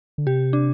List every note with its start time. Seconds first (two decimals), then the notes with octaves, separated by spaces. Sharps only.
0.18 D3
0.27 C3 G4
0.53 D4